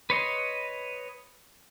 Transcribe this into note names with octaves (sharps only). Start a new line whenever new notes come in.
B4 C#5 D#5 C6